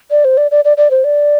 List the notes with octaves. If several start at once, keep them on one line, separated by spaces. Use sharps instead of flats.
D5
C5
D5
D5
D5
D5
C5
D5